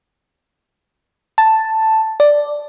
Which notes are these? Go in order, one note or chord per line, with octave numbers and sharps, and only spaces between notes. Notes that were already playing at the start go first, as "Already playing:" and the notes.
A5
D5